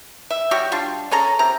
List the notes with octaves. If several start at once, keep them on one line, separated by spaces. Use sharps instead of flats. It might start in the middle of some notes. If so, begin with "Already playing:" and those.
E5
G3 F#4 G4 C#5
G3 D4 F4
C#4 G#4 A4 A#5
C3 A#5